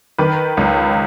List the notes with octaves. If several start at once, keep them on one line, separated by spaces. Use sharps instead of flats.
D#3 B4
C#2